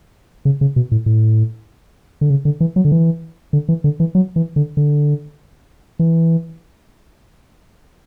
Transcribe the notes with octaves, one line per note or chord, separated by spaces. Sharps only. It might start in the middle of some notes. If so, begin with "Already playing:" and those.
C#3
C#3
B2
A2
A2
D3
C#3
D3
E3
F#3
D3
E3
D3
E3
D3
E3
F#3
E3
D3
D3
E3